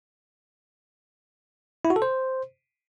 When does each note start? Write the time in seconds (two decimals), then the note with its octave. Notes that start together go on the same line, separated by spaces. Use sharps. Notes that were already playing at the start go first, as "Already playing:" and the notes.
1.85 E4
1.90 F#4
1.96 A4
2.02 C5